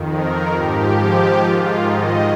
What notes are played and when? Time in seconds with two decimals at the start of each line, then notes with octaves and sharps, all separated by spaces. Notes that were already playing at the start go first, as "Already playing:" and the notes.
Already playing: F2 D#3
0.09 A#4
0.53 G#2 F3 G4
0.96 G4
1.40 G#2 D#3 F4
1.83 D#5